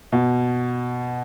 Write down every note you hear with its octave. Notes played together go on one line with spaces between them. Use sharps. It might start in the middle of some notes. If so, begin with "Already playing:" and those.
B2